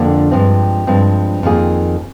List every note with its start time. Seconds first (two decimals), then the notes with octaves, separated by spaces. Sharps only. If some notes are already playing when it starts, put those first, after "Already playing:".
Already playing: F2 D3 F3 A#3 D4
0.31 G2 F3 G#3 C4
0.87 G2 F3 G#3 C4
1.43 F2 D#3 A#3 F4 G#4